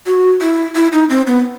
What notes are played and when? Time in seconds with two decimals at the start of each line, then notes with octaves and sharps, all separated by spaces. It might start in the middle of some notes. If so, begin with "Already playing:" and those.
0.06 F#4
0.41 E4
0.75 E4
0.93 D#4
1.10 C4
1.27 B3